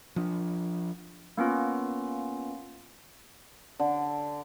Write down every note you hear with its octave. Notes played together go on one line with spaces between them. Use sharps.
F3 D4
A#3 B3 C#4 F4
D3